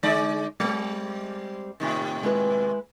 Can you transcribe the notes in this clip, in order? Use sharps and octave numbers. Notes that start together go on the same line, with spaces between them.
D3 G#3 D5
G3 G#3 C4
A2 C3 D#3
G#3 E4 B4